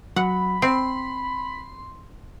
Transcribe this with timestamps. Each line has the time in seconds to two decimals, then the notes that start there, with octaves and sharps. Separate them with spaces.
0.16 F#3 F#5 B5
0.62 C4 C6